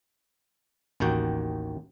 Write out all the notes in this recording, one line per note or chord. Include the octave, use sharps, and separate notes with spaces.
A1 D#2 D#3 D#4 F#4 G5